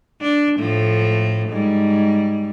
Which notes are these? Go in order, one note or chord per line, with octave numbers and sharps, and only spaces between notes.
D4
A2 F3 A3
G#2 G3